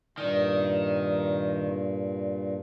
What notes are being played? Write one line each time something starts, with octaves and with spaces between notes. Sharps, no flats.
G2 A#2 D#3 D5